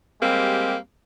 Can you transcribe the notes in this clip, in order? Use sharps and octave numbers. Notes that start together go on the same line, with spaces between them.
G3 G#3 A#3 C4 G4